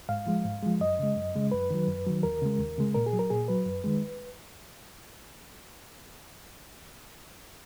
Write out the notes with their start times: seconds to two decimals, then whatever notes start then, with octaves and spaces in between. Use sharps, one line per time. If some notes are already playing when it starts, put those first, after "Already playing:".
0.09 G#2 F5
0.26 F3 G#3
0.44 G#2
0.63 F3 G#3
0.80 F#2 D#5
0.99 C#3 G#3
1.16 F#2
1.35 C#3 G#3
1.52 F#2 B4
1.70 D#3 F#3
1.88 F#2
2.06 D#3 F#3
2.23 D#2 A#4
2.42 C#3 G#3
2.59 D#2
2.78 C#3 G#3
2.94 A#2 A#4
3.06 G#4
3.13 F#3
3.19 A#4
3.30 A#2 G#4
3.48 F#3 B4
3.66 F#2
3.84 D#3 G#3